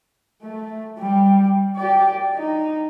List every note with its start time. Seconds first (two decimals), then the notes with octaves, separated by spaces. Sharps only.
0.43 A3
0.99 G3
1.76 G4 D5
2.35 D#4